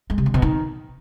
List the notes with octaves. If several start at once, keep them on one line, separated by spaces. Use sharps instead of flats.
G#3
C3
D3
B2
D#3